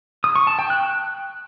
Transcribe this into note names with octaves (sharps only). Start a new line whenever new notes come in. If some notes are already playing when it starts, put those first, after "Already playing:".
D#6
C#6
A5
G5
F#6